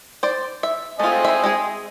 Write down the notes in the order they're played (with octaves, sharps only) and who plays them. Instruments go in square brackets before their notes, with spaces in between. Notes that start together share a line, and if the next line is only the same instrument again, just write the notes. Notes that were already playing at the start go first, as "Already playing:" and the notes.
[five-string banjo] C5 D5
E5
[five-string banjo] A3 F4 [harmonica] C4 D#5 G#5
[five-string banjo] E5 B5
G#3 G#4